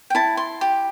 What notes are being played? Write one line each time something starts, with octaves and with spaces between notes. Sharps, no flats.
G5
E4 A5
C6
G4